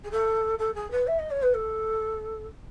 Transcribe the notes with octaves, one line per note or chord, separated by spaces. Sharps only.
G#4
A4
A4
G#4
B4
E5
D#5
C#5
B4
A4